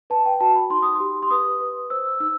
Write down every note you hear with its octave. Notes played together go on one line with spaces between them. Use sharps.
B4 A5
G5
F#4 A5
B5
D#4 C6
D#6
C6
G4
C6
B4 D#6
B4
C5 E6
D#4 E6